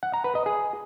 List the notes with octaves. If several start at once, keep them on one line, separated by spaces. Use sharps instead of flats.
F#5
A#5
B4
D#5
G#4